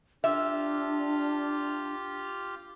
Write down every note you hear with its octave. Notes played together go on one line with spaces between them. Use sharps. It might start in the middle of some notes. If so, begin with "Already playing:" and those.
D4 F4 G4 E5 F6